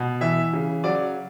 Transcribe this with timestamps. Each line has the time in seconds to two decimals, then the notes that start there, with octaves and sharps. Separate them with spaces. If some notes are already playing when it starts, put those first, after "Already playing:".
Already playing: B2
0.21 E3 E5
0.53 C#3
0.84 F#3 D5